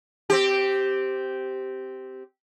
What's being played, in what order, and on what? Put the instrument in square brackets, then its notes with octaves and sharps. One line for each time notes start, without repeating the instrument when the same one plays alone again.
[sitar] C4 G4